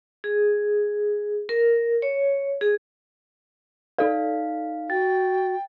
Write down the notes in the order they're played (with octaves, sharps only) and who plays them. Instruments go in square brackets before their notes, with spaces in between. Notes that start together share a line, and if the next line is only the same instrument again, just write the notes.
[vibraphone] G#4
A#4
C#5
G#4
[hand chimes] D#4 F5 [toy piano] A4 D5
[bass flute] F#4 [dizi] G5 [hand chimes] A6